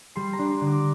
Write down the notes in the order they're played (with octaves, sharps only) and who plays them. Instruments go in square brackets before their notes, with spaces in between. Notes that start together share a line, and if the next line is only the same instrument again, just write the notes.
[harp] G3 C6
A#5
D4
C6
D3
D6